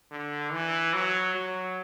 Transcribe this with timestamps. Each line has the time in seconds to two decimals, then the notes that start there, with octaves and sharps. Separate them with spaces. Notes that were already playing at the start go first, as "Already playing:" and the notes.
0.11 D3
0.52 E3
0.94 F#3
1.35 F#3